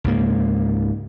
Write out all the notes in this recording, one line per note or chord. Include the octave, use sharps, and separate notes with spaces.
C#2 G#2 A#3